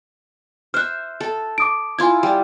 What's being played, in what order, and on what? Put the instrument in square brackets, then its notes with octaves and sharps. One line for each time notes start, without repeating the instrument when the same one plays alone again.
[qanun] C5 E5 [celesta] F6 F#6
[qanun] A4
[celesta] D6 D#6 D7
[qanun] E4 F4 [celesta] G#5 C6 G#6
[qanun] G3